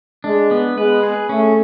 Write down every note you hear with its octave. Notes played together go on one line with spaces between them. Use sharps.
G#3 D4
B3
G#3 B4
G#4
A3 C#4